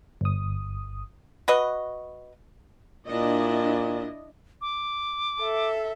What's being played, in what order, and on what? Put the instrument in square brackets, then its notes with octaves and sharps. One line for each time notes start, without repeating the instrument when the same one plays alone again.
[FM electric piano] G1 D#6
[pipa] F#4 B4 D#5
[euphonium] A#2 [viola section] D4 E4 D#5
[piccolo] D6
[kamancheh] A4 E5